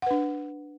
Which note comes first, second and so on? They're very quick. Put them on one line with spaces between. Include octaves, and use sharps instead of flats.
F#5 B4 D4